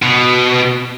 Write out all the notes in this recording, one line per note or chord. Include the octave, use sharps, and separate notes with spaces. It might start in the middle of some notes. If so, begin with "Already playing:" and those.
B2